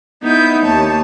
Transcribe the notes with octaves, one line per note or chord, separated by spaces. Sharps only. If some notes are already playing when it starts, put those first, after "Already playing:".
B3 D#4 E4 G6
D#2 C#5 A5